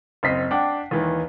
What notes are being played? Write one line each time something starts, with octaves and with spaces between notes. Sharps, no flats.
F#1 C4 D#5 B6 C7
D4 F#5 G5 D6
D#2 D#3 E3